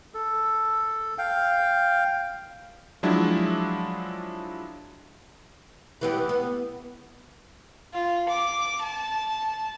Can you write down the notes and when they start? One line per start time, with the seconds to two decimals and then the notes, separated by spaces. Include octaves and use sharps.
0.14 A4
1.18 F5 G5
3.03 F3 F#3 G#3 D4 E4
6.01 E3 B3 G4
6.29 B3
7.93 F4
8.29 D6
8.83 A5